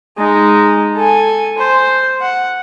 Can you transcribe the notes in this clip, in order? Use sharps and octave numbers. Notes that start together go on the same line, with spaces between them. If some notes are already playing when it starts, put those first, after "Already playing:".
G#3 D#4
A4 G#5
C5
F#5